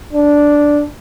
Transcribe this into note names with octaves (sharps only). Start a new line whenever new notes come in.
D4